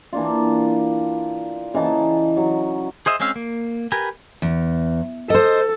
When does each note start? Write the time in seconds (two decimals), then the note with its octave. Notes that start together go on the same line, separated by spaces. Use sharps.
0.13 E3 A#3 D4 F4
1.74 C#3 E3 D#4 A5
2.37 F#3
3.06 G#4 C5 D#5 E5
3.20 G#3 C4 C#4 F5 E6
3.36 A#3
3.92 G4 A#4 B4 G#5
4.42 E2
5.30 A4 C5 D#5